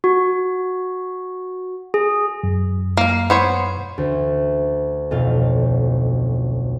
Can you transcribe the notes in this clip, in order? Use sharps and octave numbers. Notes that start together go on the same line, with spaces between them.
F#4
G#4
F#2
A#3 F5
B3 C5 C#5
D2
B1 F2 F4 F5